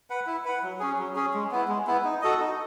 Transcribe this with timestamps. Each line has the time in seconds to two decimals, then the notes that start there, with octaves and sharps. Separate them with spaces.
0.10 B4 F#5
0.27 E4
0.45 B4 F#5
0.63 F#3
0.80 C#4 G#4
0.99 F#3
1.16 C#4 G#4
1.34 G#3
1.51 B3 E4
1.68 G#3
1.87 B3 E4
2.05 D#4
2.22 F#4 A4 D#5
2.40 D#4